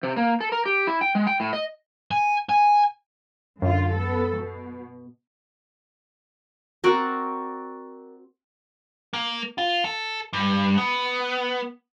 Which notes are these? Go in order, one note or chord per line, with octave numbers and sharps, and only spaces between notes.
C3
A#3
A4
A#4
G4
E4
G5
G#3
G5
A2
D#5
G#5
G#5
F#2 D3 F4
B3 A4
B2
C4 F#4 A#4 D5
A#3
F4
A4
G2
B3